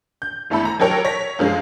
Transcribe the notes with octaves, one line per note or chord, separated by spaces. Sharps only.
G6
G#1 E2 A3 A4 B5
A#5
F#3 G4 A4 A#4 C#5
C#5 A#6 B6
F#2 F3 G#3